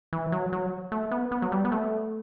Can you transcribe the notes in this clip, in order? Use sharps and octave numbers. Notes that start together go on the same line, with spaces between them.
E3
F#3
F#3
A3
B3
B3
F#3
G3
B3
A3